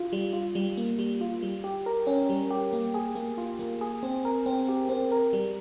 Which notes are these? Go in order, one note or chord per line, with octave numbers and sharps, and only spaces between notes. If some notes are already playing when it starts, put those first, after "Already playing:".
Already playing: F4
G3
F4
G3
A#3
G3
F4
G3
G4
A#4
C#4
G3
G4
A#3
G#4
A#3
F4
A#3
G#4
C4
A#4
C4
G4
C4
A#4
G3